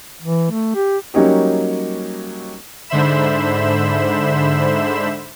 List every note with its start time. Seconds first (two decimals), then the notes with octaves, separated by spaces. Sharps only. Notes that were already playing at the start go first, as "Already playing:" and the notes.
0.23 E3
0.51 A3
0.75 G4
1.14 F#3 G3 A#3 C#4 D#4 G4
2.89 G#2 D3 C5 E5 B5 E7